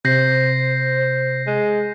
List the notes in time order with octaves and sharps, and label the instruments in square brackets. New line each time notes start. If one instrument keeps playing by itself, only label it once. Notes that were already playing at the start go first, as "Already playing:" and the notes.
[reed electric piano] C3 [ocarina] C5 [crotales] G6 A#6 C7
[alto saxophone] G#3